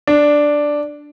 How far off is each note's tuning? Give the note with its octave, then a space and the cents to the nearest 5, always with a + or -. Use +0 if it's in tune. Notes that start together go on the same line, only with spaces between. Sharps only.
D4 +0